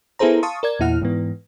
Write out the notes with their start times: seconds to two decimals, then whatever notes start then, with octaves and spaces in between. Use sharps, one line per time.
0.19 B3 E4 G#4 A4 C5 A#5
0.43 F5 A5 C6 C#6 D#6
0.63 A#4 D5 G#6
0.79 E2 A#2 E4 F#5 F6
1.02 G#2 E3 B3